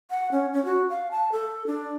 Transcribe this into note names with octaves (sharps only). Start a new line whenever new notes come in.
F#5
C#4
C#4
F#4
F5
A5
A4
D4